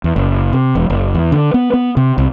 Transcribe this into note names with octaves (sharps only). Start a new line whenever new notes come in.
E2
F#1
C3
E1
F#1
E2
D3
B3
B3
C3
C2